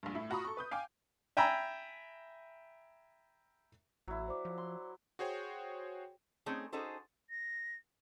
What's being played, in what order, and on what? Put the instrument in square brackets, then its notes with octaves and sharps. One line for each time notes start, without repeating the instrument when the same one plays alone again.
[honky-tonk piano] A#1 G2
A2 E4
F4 F#4 A#5 B5 C#6 D#6
A4 C#6
B4 D#6 G6
F5 G5 G#5 D6
[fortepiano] E5 G5 G#5 A#5 B5 E6
[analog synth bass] A1 [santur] F#3 E4
[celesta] C5 D5 D6
[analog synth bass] F3
[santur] C6
[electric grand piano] F#4 G#4 C5 C#5 G5
[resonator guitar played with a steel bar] A3 C4 C#4 D#4 G#4
C#4 D#4 F#4 G#4 A4 C5
[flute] A#6